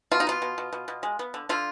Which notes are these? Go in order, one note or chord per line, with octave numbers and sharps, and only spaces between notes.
B2 F4
D#4
B3 F4
B2
B2
B2
B2
G#3
B3
D3
D3 F4